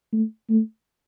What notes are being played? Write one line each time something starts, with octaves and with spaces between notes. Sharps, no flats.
A3
A3